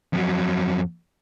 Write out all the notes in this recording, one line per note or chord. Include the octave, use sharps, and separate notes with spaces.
F2 F#3